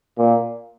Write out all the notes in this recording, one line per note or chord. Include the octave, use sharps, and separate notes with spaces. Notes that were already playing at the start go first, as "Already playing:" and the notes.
A#2